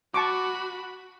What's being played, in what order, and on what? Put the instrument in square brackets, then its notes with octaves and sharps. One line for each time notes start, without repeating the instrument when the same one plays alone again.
[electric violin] F#4 B5 [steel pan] A5 C#6 D6